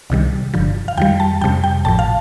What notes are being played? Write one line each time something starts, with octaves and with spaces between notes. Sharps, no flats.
C2 C3 D#3 G3
G1 G2 D3 F3
F5
F2 D#3 G3 G5
A5
F2 C3 G3 G5
G5
A1 A2 F3 A5
F5